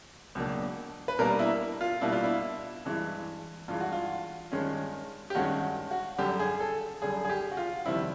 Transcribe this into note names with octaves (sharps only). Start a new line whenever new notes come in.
C#2 B2 F#3 A#3 D4
B4
B2 G3 A#3 D4 A#4
E4
F4
B2 G3 A#3 D4 E4
F4
E4
G2 E3 G#3
G2 E3 G#3 F4
F#4
F4
G2 D#3 G#3 C#4
G4
G2 D#3 G#3 C#4 F#4
F#4
F#2 D3 G3 G4
G#4
A4
F#2 D3 G3 G#4
G#4
G4
F#4
F4
F2 C3 D#3 G3 C4 E4